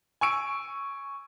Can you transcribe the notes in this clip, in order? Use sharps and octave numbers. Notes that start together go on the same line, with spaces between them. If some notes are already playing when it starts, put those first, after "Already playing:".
G#5 C#6 E6 D7